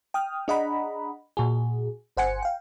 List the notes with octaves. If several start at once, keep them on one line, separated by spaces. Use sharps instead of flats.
G5 D#6 F6
D4 G#4 D#5 F#5 A#5 B5
A#2 F#4 G#4
G1 C5 F#5 G#5 C#7
F5 G5